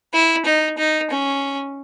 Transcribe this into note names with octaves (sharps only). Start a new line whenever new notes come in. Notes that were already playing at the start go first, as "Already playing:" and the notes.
E4
D#4
D#4
C#4